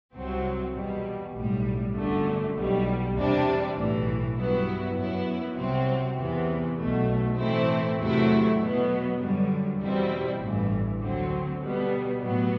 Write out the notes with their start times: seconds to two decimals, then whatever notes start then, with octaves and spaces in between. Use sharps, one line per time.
0.13 C2 C3 F#3 C4
0.74 E2 B2 G3
1.34 B1 A2 G3
1.95 G1 F#2 D3 A3
2.55 B1 B2 G3
3.15 E2 C3 G3 D4
3.76 B1 A2 E3
4.36 G2 F#3 B3 E4
4.96 F#2 F#3 B3 E4
5.57 C2 C3 F#3 C4
6.17 E2 C3 E3 B3
6.78 B1 B2 A3
7.37 A2 E3 A3 C4 E4
7.99 E2 C3 F#3 A3 E4
8.59 B2 F#3 B3
9.19 F#2 D3 G3
9.79 E2 B2 G3 C4 E4
10.39 A1 G2 E3
11.00 D2 D3 F#3 C4
11.60 B2 G3 B3
12.21 A2 F#3 B3